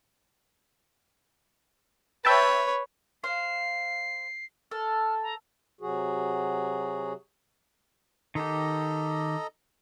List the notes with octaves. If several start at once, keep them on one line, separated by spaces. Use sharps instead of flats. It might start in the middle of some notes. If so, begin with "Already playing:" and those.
B4 C#5 E5 G5 A5
C5 F5 C7
A4 F6
A#5
C3 F#3 F#4 G#4
D#3 G4 A4 D#5 A#5